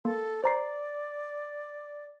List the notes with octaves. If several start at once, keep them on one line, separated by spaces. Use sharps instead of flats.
A#3 A4
C5 D5 A#5 C7